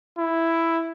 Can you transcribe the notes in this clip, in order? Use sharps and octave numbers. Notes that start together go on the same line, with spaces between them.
E4